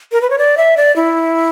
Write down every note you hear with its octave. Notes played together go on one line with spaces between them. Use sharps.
A#4
B4
C#5
D5
E5
D5
E4